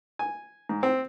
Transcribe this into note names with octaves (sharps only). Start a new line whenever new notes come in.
G#5
G#2
C4